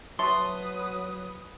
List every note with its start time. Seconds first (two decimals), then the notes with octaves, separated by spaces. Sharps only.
0.19 F#3 B4 C#5 E5 A5 C6 D#6